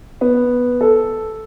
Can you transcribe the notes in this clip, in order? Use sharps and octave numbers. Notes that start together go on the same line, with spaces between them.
B3
A4